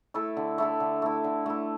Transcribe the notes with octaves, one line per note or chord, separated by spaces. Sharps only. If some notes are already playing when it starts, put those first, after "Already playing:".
A3 E4 A4
D3
A3 E4 A4
D3
A3 E4
D3
A3 E4